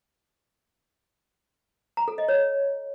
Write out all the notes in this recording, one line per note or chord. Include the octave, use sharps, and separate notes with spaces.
A#5
A4
D#5
C#5